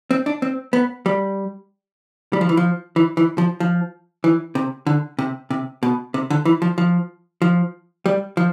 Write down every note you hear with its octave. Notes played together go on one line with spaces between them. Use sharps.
C4
D4
C4
B3
G3
G3
F3
E3
F3
E3
E3
F3
F3
E3
C3
D3
C3
C3
B2
C3
D3
E3
F3
F3
F3
G3
F3